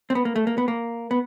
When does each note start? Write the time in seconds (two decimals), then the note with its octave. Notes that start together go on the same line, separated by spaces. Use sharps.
0.10 C4
0.15 B3
0.25 A#3
0.36 A3
0.47 A#3
0.58 B3
0.68 A#3
1.11 B3